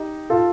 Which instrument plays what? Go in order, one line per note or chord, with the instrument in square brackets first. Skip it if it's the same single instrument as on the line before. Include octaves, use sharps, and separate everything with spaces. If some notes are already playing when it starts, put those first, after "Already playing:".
Already playing: [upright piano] D#4 G4
F4 A4